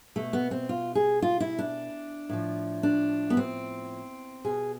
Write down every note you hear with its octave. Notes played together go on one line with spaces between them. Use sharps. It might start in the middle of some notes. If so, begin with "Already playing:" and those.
B2 A3
B3
C4
F4
G#4
F4
E4
D4
A2 F3
D4
B3
C4
B2 G#4